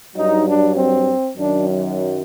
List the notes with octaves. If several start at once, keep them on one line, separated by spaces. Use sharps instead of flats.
G2 F#3 D#4
D4
C4
F#2 D#3 F#3 D4